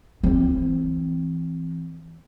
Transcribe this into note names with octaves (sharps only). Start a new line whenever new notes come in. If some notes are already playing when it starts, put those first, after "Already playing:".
E3 C4